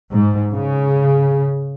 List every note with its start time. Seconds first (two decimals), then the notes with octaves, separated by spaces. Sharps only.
0.11 G#2
0.52 C#3